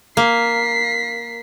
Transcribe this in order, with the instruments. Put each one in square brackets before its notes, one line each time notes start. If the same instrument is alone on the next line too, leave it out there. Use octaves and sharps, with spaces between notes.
[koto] A#3 [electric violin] B6 C7